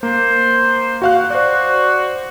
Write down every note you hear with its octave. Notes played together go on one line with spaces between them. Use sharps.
A#3 C5
F#4 F5 F#6
F#4 C5 D5